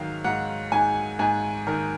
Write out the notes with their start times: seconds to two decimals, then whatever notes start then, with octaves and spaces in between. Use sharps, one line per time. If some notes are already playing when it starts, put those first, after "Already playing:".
Already playing: G#2 D#3 F#3 F5
0.24 G#2 F#5
0.72 G#2 G#5
1.19 G#2 G#5
1.67 D#3 A#4